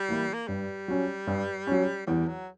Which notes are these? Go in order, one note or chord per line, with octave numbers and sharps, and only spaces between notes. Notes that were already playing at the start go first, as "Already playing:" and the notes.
Already playing: G3
E3 A#3 E4
A#3
G2 G3
F#3 C#4
G2
F#3 C#4
E2 G3
F#3